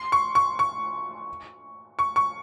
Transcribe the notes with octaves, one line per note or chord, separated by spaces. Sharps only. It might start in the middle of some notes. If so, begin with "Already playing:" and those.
Already playing: C6
C#6
C#6
C#6
C#6
C#6